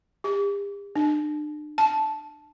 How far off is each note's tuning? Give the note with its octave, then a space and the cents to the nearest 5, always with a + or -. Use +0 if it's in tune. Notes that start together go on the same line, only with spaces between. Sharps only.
G4 +45
D4 +40
A5 -10